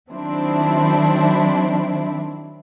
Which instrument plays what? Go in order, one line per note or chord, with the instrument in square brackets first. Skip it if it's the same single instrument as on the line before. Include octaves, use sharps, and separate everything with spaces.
[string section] D#3 F#3 C4 D4 E4